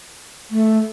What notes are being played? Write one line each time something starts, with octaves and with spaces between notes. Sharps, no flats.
A3